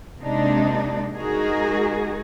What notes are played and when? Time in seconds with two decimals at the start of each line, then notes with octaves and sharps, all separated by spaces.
0.21 C3 G#3 A#3 D4 D#4
1.13 G#3 D#4 F#4 G#4 A#4